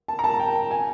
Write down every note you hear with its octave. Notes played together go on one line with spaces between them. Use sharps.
A5
A#5
A5
G5
G#5